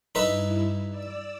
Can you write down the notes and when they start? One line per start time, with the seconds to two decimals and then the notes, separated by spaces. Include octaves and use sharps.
0.15 G2 D#4 E4 B4 E5
0.90 D5 E6